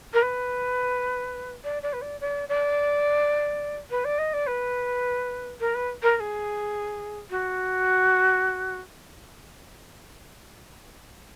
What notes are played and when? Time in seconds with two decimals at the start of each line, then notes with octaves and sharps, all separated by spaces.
0.14 A#4
0.22 B4
1.64 D5
1.83 D5
1.93 B4
2.02 D5
2.21 D5
2.49 D5
3.91 B4
4.05 D5
4.19 D#5
4.33 D5
4.47 B4
5.60 A#4
5.75 B4
6.03 A#4
6.17 A#4
6.20 G#4
7.30 F#4